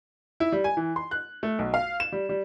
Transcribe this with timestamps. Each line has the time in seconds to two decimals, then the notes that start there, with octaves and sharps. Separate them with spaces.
0.40 E4
0.52 G3
0.64 G#5
0.77 E3
0.96 C6
1.11 F#6
1.43 A3
1.59 B1
1.74 F5
2.00 E7
2.12 G3
2.29 G3